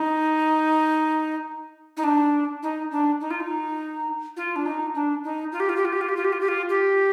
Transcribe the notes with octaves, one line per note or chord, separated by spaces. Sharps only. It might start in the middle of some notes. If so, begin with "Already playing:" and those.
Already playing: D#4
D#4
D4
D#4
D4
D#4
F4
D#4
F4
D4
D#4
D4
D#4
F4
G4
F4
G4
F4
G4
F4
G4
F4
G4
F4
G4
F4
G4